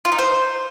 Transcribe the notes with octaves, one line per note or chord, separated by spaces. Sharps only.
F4
D#4
C5